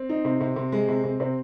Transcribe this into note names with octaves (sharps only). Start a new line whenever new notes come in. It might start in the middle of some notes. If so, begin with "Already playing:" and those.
Already playing: C4
D#4
C3
C3
C3
G#3
C3
C3
C3 C4